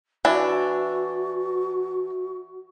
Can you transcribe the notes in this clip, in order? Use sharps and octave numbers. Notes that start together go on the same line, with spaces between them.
E3 D4 F#4